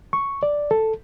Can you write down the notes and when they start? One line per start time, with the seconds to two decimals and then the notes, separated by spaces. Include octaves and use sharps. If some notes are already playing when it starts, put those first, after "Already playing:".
0.13 C#6
0.43 D5
0.71 A4